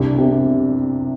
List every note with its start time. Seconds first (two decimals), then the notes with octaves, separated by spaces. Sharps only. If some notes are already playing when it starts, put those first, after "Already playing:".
Already playing: C2 D4
0.18 C3